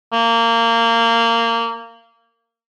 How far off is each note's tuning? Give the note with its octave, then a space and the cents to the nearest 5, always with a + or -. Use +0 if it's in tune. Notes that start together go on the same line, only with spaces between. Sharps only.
A#3 -20